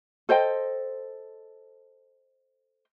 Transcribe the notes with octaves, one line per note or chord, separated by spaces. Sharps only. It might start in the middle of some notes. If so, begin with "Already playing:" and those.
A4 C5 D#5 G5